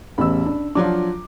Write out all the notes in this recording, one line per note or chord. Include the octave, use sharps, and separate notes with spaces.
A1 E2 B5 E6
D4
F3 F#3 D4 F4 D6